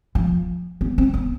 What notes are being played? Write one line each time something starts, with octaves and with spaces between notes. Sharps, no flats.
F3
B3
C4
B3